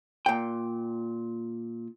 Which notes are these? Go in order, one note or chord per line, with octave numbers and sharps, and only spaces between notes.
A#2 G5